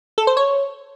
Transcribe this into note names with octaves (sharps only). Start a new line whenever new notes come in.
A4
C5
C#5